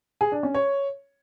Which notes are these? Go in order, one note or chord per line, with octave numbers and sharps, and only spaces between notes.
G#4
D4
C#4
C#5